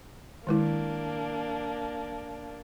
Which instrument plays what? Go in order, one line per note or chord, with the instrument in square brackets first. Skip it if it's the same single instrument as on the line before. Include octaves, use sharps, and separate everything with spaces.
[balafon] D#3 G#3 E4 [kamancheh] A#3 D4